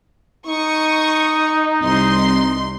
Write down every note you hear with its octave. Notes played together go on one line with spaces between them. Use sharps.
D#4 C#6 D#6
C2 C6